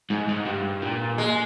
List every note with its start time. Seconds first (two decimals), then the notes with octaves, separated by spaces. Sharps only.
0.10 G#2
0.28 G#2
0.46 G2
0.82 A#2
1.18 G#3